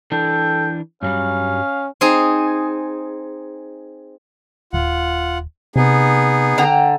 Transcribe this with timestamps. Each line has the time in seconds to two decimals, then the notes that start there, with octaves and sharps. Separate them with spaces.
0.12 E3 D4 A4 G5
1.03 G2 F#3 G3 C#4 F5
2.01 C4 D#4 G#4
4.73 D#1 F4 F#5
5.76 C3 B3 D#4 G#4
6.58 D3 G5 A#5